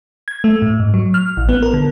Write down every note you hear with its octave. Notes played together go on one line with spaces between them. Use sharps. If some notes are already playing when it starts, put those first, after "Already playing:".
G#6
A3
A2
G#2
F#3
F6
A1
B3
A#4
D3